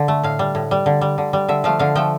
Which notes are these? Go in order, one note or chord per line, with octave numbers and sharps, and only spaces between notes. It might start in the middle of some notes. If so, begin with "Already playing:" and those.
Already playing: D3
A3
A2 F5
G3
A2
G3
D3
G3
D3
G3
D3 E5
F3 A3 F5
D3 F5
F3 A3 G5